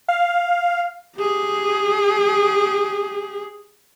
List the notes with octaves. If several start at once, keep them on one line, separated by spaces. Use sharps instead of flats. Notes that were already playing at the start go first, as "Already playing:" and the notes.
F5
G4 G#4